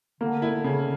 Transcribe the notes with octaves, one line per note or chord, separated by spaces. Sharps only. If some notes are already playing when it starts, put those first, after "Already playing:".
D3 A#3
E4
C#3